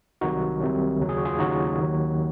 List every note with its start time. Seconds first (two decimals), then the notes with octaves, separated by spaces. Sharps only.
0.21 C2 C3 D#3 F#3 D#4 F#4
0.60 C2 C3 D#3 F#3
1.00 D#2 C#3 F#3
1.09 G#4
1.18 F#4
1.25 F4 G#4
1.39 D#2 C#3 F#3 D#4 F#4
1.79 D#2 D#3 F#3